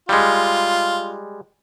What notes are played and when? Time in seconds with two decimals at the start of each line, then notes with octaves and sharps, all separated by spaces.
0.09 G3 G#3 F4